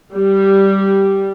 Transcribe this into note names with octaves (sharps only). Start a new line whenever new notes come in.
G3